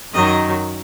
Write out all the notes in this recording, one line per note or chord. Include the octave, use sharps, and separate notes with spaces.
F#2 D#3 F#3 D#5